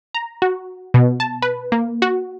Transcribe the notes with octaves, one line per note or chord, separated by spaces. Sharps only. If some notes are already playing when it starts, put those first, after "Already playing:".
A#5
F#4
B2
A5
B4
A#3
F#4